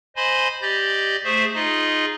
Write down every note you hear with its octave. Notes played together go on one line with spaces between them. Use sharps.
C5 D#5 G#5 B5 C6
G4 D5 D#5 G6
A3 G#4 C5 E5
D#4 F4 G#4 D#5